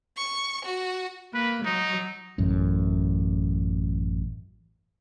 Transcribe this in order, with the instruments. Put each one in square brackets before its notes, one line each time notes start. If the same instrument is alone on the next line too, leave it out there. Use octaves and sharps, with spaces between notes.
[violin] C#6
F#4
[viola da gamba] A#3 [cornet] B4
[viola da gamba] F#3 [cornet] D#4
[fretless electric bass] A1 F#2